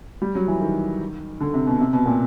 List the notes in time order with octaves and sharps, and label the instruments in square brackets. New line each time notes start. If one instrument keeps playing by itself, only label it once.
[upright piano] G3
F#3
E3
D#3
D3
C3
B2
C3
B2
A#2